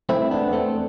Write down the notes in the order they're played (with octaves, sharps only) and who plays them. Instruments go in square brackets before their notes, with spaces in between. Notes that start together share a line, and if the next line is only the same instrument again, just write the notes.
[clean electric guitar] A3 C4 E4
E2 B3 D4
E2 A3 C4